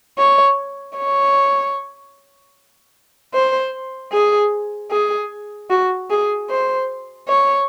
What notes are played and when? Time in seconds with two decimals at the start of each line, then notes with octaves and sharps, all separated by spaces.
0.18 C#5
0.97 C#5
3.34 C5
4.12 G#4
4.91 G#4
5.70 F#4
6.10 G#4
6.50 C5
7.28 C#5